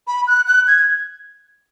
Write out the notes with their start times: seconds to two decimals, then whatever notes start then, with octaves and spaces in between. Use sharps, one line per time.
0.07 B5
0.27 F#6
0.48 F#6
0.68 G#6